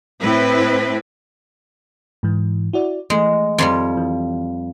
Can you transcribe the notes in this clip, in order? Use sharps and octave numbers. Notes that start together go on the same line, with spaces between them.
A2 C4 E4 B4
G#2 E3
E4 F#4 D5
E3 G#3 A3
F2 F3 G3
E3